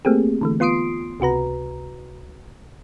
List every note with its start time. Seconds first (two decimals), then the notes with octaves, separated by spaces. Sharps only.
0.05 A3 A#3 C4 G4 G#4
0.41 D3 E3 A3
0.60 B3 F4 C6 D#6 C7 D7
1.20 C#2 C3 F#4 B4 A#5